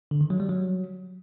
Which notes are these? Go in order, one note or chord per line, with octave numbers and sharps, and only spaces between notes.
D3
D#3
F#3
G3
F#3